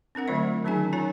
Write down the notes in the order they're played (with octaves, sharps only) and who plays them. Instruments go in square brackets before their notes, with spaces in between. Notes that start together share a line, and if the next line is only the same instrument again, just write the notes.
[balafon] C4 D4 A#4 F#5
D3 F#3 A3 F4 C5 E5
A3
D#3 F#3 C#4 D#4 G#4 G#5
D#4 F4 A#4 C#5 G#5 A#5